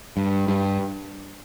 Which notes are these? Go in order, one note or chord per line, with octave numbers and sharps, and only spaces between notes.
G2
G2